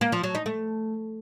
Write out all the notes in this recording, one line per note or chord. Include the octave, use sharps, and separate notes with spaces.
A#3
F3
F#3
D#4
A3